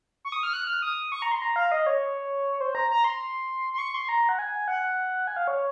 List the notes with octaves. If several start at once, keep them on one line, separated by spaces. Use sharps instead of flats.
C#6
D#6
F6
F#6
F6
D#6
C#6
A#5
C6
A#5
F5
D#5
C#5
C5
A#5
A#5
C6
C6
C#6
C6
A#5
F#5
G#5
F#5
G#5
F5
C#5